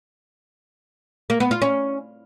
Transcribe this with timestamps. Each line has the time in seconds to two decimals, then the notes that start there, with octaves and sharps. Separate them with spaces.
1.30 A#3
1.40 B3
1.51 F4
1.62 C#4